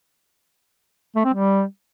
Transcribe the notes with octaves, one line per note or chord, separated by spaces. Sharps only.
A3
C4
G3